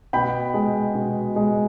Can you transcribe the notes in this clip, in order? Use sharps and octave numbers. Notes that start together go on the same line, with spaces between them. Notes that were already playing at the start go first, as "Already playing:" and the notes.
B2 G5 B5
G#3
B2
G#3